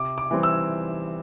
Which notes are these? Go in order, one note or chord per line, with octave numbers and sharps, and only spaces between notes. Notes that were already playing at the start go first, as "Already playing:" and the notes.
Already playing: C3 D6
D6
E3 G3 C4
E6